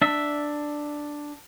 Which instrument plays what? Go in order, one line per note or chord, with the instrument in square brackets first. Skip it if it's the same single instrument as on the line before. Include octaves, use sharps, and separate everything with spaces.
[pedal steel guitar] D4 E5